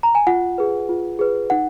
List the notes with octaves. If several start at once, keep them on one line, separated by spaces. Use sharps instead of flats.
A#5
G#5
F4 F#5
G#4 B4
F4
G#4 B4
D#4 F#5